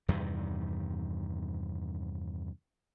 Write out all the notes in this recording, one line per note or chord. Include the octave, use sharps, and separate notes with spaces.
E2 G2 C3 D#3